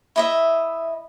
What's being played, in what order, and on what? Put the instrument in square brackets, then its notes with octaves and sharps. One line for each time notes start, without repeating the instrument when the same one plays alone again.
[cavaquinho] E4 D#5 E5